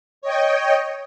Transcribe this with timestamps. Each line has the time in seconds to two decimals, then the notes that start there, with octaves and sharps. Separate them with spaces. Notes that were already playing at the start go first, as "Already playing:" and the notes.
0.22 C#5 D#5 G5